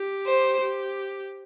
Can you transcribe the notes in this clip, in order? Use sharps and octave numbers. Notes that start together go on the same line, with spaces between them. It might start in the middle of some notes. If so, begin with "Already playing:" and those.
Already playing: G4
C5
G4